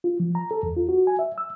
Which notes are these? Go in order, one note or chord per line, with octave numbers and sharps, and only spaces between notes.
F4
F3
A#5
A4
E2
F4
F#4
G#5
E5
E6